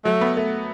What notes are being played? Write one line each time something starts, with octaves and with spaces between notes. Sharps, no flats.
F#3 A3
B3
A3